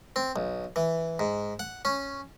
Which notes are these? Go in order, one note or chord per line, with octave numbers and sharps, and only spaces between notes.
C4
B1
E3
G#2
F#5
C#4